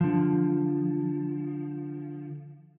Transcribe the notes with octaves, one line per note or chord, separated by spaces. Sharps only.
D3 F3